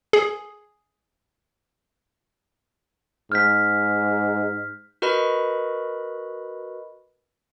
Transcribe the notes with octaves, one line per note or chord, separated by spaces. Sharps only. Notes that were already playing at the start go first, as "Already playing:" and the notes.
G#4
G#2 F6 G6 B6
F#4 A#4 B4 D#5 B5